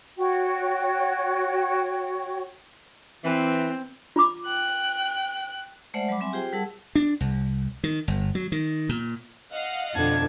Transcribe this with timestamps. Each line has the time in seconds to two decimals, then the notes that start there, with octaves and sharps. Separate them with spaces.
0.18 F#4 C#5 G5
3.25 E3 C4
4.16 F4 B5 D6
4.46 G5 F#6
5.94 G#3 A3 C5 D5 E5 F#5
6.09 F#3 G3 B5 D6
6.21 F#3 C4 E5 G#5
6.33 F4 G4 G#4 C5 G5
6.53 G3 G#4 A#4 F#5 A5 E6
6.95 D4
7.21 C2
7.84 D#3
8.08 G1
8.35 F#3
8.52 D#3
8.89 A#2
9.51 D#5 F5 F#5
9.95 F2 B2 D3 A5 G#6